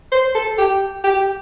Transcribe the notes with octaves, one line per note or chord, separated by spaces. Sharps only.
C5
A4
G4
G4